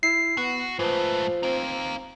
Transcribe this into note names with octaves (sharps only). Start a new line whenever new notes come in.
E4 C7
B3 F#4
G#2 F3 A3 B4
C4 D#4 F5